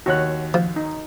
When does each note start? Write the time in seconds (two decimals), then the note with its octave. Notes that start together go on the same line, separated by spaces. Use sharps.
0.06 D#2 F#4 C#5 F#6
0.54 F3
0.76 D#4